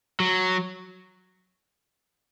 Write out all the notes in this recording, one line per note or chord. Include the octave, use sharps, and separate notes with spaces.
F#3